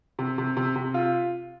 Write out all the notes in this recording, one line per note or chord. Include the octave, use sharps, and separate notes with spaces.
C3
C3
C3
C3
F4